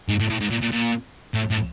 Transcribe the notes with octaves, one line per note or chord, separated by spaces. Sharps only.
G#2
A2
A2
G#2
A#2
A#2
A#2
A2
A2